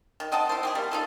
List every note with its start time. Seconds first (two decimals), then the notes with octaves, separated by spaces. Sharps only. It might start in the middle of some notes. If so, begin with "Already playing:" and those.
0.20 D#3
0.32 C4 D#5 F#5 A5
0.49 E4 C5
0.63 C4 G4 G#4
0.75 G3 A#3
0.91 D#4 F4 A4